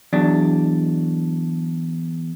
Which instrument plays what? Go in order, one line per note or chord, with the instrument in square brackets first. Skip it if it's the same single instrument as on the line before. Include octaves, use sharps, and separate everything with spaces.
[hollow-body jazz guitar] E2 F#3 D4